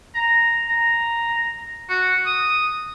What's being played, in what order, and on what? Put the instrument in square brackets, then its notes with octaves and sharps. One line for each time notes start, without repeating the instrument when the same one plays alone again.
[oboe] A#5
A#5
F#4
D#6